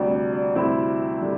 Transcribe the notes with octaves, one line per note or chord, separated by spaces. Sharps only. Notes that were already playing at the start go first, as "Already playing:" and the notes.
Already playing: D2 C3 G3 D4
D4
D4
D2 C3 G3 C4 E4
D3 G3